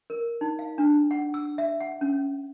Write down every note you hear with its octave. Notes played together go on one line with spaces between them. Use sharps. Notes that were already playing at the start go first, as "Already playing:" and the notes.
A#4
D#4
F5
D4
F#5
E6
E5
F#5
C#4